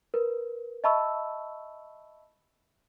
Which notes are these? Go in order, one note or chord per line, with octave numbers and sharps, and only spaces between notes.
A#4 B4
D#5 E5 A5 B5 C#6 E6